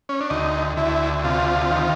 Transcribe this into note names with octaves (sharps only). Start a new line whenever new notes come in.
C#4
D4
D2 D#4
D2 E4
C3 F4
D#3